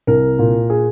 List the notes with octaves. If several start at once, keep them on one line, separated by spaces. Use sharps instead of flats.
C2 A#4
A#2
G#4